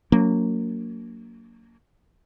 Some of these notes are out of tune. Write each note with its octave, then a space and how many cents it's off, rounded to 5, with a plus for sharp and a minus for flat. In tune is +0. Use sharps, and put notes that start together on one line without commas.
F#3 -15 A#3 -15 D4 -45